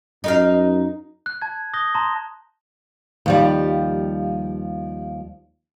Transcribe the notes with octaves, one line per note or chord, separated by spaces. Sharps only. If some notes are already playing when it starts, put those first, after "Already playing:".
F#2 D#4 A#4 F5
F#6
A5 G#6
D#6 F#6 G6 A#6 G7
A5 A#5 C6
D#2 F3 G3